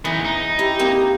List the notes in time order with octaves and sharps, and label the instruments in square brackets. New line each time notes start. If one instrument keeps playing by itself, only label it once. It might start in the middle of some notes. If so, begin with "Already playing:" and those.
[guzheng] E3 [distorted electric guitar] B3 D#4
[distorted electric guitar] D#4
[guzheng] E4 [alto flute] G4
[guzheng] A#3 C4